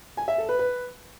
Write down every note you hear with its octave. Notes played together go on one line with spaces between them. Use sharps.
G#5
E5
A4
B4
B4